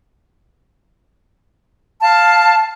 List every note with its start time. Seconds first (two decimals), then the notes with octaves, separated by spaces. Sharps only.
2.02 F5 A5